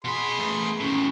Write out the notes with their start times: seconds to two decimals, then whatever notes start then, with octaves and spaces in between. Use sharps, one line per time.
0.05 B2 G#4 B5 C6
0.40 A3 B3
0.80 D#2 A2 C#4